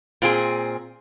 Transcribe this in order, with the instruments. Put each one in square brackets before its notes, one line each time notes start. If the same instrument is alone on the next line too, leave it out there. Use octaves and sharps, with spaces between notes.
[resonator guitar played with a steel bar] A#2 C4 G#4